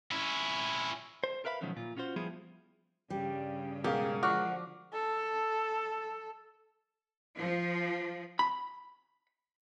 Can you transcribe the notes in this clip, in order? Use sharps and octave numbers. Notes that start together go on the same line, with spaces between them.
C#4 E4
C5
A#4 B4 E5 F5 B5
B2 D#3 F3 F#3 A3 C#4
A#2 F4
C#4 F4 F#4 C5
F3 G3 B3 E4 F4 G#4
G2 C#3 G3
B2 G#3 G4 A#4 F5
D3 F3 F#4 D6 F6
A4
F3
B5